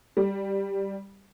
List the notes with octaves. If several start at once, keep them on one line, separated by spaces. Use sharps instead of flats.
G3